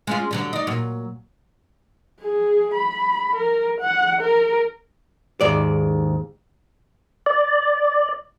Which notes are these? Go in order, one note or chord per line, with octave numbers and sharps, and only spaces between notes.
G#3 C#4 F4
D3 F#3 G3
D#4 D5
A#2 F#3
G#4
B5
A#4
F#5
A#4
D#2 G#2 D5
D5